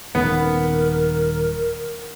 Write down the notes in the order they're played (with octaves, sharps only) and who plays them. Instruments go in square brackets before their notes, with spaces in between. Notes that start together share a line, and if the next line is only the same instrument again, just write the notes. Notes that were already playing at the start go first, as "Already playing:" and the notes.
[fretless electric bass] D#1 D#3 C#4 [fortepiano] B3 [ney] A#4